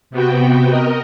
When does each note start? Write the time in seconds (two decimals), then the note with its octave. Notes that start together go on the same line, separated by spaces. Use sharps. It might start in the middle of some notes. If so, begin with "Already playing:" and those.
0.11 C3 B3 F#4 G5
0.69 A#4 D#5